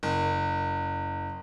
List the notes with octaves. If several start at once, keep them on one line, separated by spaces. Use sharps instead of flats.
F#1